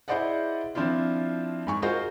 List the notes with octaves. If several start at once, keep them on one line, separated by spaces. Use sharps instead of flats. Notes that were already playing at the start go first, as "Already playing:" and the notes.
E4 G#4 C5 D5 D#5 F#5
F3 C4 D4 E4 F4
G#2 G#5 C#6
F4 F#4 G#4 A#4 C5 D#5